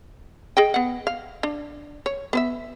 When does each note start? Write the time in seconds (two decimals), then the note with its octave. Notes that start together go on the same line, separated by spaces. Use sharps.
0.57 G#4 D#5 G5
0.74 B3 F#5
1.07 F5
1.43 D4
2.06 C#5
2.33 B3 C5 E5